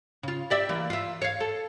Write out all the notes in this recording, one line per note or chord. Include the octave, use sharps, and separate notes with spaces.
C#3 F4
G4 D5 E5
E3 A#3
F4 E5
C#5 F5
A4